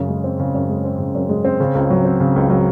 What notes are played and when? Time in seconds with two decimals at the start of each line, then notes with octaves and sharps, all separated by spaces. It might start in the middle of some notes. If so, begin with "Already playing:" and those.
Already playing: F#2 C#3
0.09 G#3
0.24 C4
0.39 C#3
0.55 F#2
0.69 G#3
0.85 C4
0.99 C#3
1.15 F#2
1.29 G#3
1.45 C4
1.60 C#3
1.75 C#2
1.90 F#3
2.05 C4
2.20 C#3
2.36 C#2
2.50 F#3